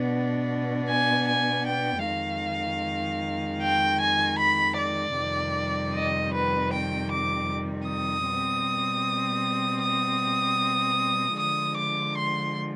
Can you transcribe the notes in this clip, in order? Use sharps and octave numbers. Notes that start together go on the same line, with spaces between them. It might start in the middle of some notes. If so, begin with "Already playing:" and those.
Already playing: B2 B3 D4
G#5
G#5
G5
F2 D#3 G#3 F5
G5
G#5
B5
D5
F2 C3 D#3 G3
D#5
B4
G5
D6
D#6
B2 G3 C4
D#6
D3 F3 G#3 D#6
D6
C6